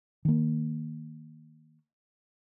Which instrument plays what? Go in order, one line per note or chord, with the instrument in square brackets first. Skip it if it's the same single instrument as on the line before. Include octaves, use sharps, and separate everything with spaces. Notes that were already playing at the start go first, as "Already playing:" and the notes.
[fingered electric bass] D#3 A#3